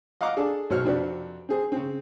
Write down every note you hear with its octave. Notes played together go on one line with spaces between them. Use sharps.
D#5 F5 F#5 A#5 D6
D4 G#4 A4
B1 B2 F#4 C5 C#5 F6
F2 C3 C4 D4 F#4 B4
C4 G#4 C5
C#3 C4